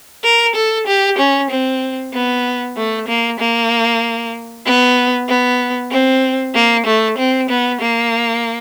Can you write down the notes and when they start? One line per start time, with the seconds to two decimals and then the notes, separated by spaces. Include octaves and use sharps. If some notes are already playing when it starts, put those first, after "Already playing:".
0.24 A#4
0.55 A4
0.87 G4
1.18 C#4
1.50 C4
2.13 B3
2.76 A3
3.08 A#3
3.39 A#3
4.65 B3
5.28 B3
5.91 C4
6.55 A#3
6.86 A3
7.18 C4
7.49 B3
7.81 A#3